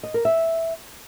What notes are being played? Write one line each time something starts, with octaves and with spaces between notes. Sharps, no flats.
D#5
A#4
E5